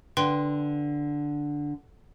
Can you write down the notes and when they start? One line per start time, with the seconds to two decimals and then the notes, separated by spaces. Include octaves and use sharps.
0.17 D3 B4 G5 C6